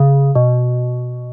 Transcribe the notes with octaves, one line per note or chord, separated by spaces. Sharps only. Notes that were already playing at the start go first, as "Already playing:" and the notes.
Already playing: C#3
B2